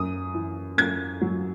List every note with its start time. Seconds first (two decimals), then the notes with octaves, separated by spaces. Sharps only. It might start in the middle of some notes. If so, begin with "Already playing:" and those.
Already playing: F#2 D#6
0.34 E3
0.77 F#2 G#6
1.21 F#3